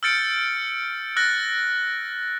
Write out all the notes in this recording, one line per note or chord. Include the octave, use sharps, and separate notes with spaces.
E6 F6 G6 A6 C#7 D7
E6 F#6 A6 A#6